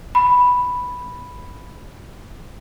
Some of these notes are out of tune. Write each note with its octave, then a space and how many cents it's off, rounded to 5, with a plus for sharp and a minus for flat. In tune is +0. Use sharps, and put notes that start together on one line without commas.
B5 +0